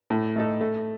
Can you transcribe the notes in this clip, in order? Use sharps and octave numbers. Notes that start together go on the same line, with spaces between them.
A2
A3 D#4 A4
A3